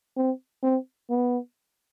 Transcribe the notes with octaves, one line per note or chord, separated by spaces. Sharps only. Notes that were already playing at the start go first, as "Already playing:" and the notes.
C4
C4
B3